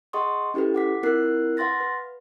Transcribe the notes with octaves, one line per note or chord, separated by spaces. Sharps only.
G#4 D#5 F#5 C6 C#6 D#6
C#4 E4 G4 A4 B4
F#5 D6 B6
C4 E4 F4 A#4 F#6 C7
B4 F5 F#5 C6 A6 A#6
B4